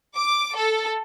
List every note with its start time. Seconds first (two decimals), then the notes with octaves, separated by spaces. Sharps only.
0.16 D6
0.56 A4